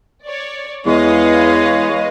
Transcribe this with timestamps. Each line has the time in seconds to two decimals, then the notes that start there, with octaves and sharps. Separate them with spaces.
0.24 C#5 D5
0.86 E2 G#3 B4 C#5 D#5 F5